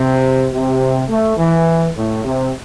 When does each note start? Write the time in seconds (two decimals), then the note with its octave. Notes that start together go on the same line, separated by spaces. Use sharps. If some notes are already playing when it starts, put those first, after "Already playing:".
Already playing: C3
0.51 C3
1.09 A3
1.37 E3
1.96 A2
2.24 C3